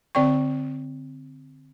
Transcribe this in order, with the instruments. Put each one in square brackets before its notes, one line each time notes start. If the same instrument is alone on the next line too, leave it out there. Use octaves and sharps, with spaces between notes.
[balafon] D3 C4 D5 G5 C#6